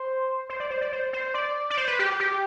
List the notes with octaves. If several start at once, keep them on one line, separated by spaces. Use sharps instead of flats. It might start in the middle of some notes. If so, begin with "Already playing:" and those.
Already playing: C5
C5
D5
C5
D5
C5
C5
D5
D5
C5
B4
G4
G4